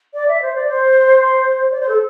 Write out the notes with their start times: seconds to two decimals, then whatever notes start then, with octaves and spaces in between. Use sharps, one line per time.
0.13 D5
0.27 E5
0.41 C5
0.55 D5
0.68 C5
1.71 D5
1.80 C5
1.88 A4